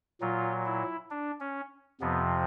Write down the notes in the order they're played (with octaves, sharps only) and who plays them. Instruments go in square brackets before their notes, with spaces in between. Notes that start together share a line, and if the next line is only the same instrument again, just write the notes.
[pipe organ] A#2 F#3 F4
E4
D4
C#4
F2 C3 F3 B3